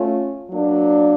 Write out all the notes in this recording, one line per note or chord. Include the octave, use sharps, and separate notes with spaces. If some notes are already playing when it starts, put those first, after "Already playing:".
Already playing: A3 C#4 F4
F#3 A#3 D4